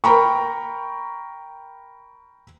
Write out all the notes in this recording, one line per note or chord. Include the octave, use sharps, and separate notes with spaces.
A#4 G5 A#5 B5 C#6